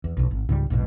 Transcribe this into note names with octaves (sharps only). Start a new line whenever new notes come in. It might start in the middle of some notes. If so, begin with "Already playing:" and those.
E2
E1 B1
G#1
C#2 G#2 F#3 G3
A#1 E2 G#2 B2